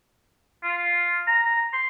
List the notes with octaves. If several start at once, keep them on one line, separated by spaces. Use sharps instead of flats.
F4
A#5
C6